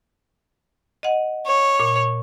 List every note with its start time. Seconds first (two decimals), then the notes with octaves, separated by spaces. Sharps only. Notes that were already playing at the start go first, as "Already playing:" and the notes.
1.03 D#5 F#5
1.46 C#5
1.80 A#2